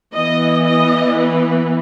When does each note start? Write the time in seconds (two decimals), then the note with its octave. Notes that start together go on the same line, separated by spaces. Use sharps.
0.13 E3 B3 D#5
0.65 D#5
1.18 B4